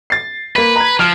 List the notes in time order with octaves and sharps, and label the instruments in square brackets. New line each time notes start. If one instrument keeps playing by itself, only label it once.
[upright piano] A6 C7
[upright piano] A#3 B6 [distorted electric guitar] B4
[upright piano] A#5 G#6
[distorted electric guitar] F3 [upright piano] F6 D7